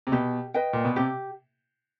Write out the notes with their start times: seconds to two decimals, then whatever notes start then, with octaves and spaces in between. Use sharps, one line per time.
0.07 C3
0.12 B2 G4
0.54 B4 D#5 G5
0.73 A#2
0.85 B2
0.96 C3 G4